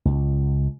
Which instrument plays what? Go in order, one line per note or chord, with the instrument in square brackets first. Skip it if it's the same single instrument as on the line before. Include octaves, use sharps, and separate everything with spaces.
[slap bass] C#2